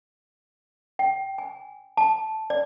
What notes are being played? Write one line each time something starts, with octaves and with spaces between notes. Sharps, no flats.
G5
G#5
A5
D5